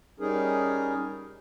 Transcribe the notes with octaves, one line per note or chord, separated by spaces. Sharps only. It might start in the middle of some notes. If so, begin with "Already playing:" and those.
G3 C#4 D#4 G#4 A#4